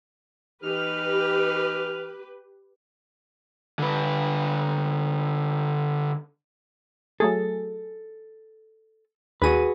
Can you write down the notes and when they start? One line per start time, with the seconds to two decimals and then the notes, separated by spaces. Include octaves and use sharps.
0.63 E3 D#4 G4 B4 F6
3.79 D3 B4
7.20 F#3 A3 G#4 A4
9.42 D#2 F#4 G#4 B4 D#7